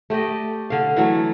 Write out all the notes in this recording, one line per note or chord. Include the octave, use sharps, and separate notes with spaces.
A3 G4 D5 D#5
D3 F5
E3 F#3 A3